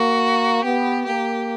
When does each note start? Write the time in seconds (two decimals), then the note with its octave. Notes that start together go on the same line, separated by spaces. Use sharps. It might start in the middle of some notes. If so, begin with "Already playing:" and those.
Already playing: A#3 F#4
0.64 B3 G4
1.06 A#3 G4